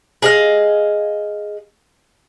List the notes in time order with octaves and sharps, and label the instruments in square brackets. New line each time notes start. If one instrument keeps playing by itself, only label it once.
[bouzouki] G#4 D#5 F5